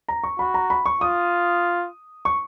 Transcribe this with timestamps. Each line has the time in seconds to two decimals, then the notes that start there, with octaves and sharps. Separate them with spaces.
0.08 A#5
0.24 C#6
0.39 F#4 B5
0.54 A#5
0.70 B5
0.86 C#6
1.01 F4 D#6
2.25 C#6